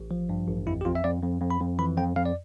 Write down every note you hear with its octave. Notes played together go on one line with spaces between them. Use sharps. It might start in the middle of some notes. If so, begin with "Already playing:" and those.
Already playing: A1
F3
G2
A1
F2 E4
G4
F2 F4
E5
F2 D5
F2
F2
B5
F2
E3 B5
F2 G5
F2 F5
D5